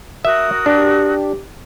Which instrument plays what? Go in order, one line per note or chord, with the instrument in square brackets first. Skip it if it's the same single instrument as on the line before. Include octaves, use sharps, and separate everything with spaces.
[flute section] F#4 A#4 D#6 [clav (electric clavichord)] E5
[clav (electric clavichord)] D4 [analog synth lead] G4